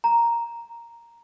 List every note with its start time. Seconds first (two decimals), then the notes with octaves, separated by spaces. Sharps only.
0.04 A#5